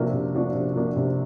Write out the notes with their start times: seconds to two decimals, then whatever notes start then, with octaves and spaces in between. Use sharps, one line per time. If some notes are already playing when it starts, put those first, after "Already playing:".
Already playing: C3 F3 A#3 D4 F#4
0.13 C3
0.34 F3 A#3 D4 F#4
0.55 C3
0.76 F3 A#3 D4 F#4
0.96 C3